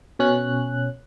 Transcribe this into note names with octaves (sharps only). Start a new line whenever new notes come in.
B2 C#4 F#6